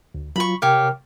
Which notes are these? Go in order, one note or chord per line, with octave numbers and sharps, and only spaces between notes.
D2
F#3 F4 B5 C#6
C3 G4 A#4 C#5 F5 F6